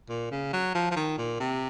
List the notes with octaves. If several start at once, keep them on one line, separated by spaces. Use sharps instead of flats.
A#2
C#3
F#3
F3
F3
D#3
A#2
C3